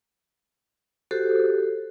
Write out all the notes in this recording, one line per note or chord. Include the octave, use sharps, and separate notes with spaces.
F#4 G4 A4 C5